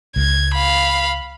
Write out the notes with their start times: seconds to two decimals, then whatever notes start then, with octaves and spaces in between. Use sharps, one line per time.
0.16 C#2 G#6
0.54 F5 B5